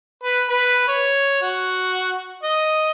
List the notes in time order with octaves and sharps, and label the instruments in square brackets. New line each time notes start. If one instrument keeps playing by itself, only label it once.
[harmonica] B4
B4
C#5
F#4
D#5